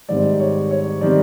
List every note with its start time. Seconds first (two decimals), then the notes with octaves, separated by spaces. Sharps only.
0.09 G#2 D#3 G3 C4 D5
0.40 C#5
0.71 C#5
1.01 D#3 G3 C4 D5